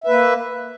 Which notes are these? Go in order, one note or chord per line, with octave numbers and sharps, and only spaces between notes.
A#3 B4 E5